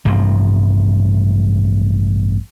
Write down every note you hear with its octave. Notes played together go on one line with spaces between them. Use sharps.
A1 G2 C3 F3